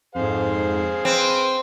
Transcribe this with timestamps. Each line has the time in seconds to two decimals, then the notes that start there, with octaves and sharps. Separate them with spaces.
0.15 F2 G#2 G#4 C5 F5
1.05 C4 B4 D7 D#7